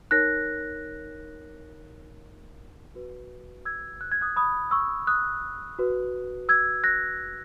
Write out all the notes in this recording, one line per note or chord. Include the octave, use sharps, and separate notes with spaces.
D#4 A#4 C#5 F#6 A#6
F#4 B4
E6 G#6
F#6
G#6
D#6 F#6
B5 D#6
C#6 E6
D#6 F#6
F#4 B4
E6 G#6
F#6 A#6